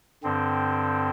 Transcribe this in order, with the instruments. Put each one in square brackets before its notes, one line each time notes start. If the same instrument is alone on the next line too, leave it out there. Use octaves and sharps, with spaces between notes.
[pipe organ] G2 D3 C4